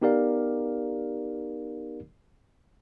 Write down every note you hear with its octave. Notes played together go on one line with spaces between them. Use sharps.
B3 D#4 G4 A#4 D5 F5